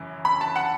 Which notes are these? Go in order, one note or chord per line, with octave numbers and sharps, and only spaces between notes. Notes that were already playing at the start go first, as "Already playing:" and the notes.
Already playing: F#2 C#3 E3 C#4 E4
B5
A5
F#5